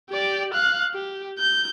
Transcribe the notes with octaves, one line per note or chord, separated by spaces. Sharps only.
G4 D5
F5 F#6
G4
G6